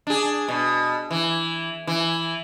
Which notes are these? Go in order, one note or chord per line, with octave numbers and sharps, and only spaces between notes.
D4 G#4
B2
E3
E3